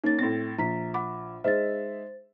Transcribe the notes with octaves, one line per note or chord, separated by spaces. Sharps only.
A#3 C#4 D#4 A6
A2 C4 A6 A#6
A#1 A#5 B6
F#5 B5 D6
G#3 D#4 C5 E5 A6